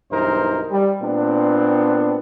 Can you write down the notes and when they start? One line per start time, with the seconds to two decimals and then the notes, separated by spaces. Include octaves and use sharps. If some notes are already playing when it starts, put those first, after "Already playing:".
0.11 B1 G2 E3 D#4 A#4 C5
0.71 G3
1.01 A#2 B3 C4 D4